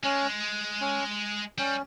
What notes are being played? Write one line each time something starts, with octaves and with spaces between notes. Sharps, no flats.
G#3 C#4
C#4
G3 C#4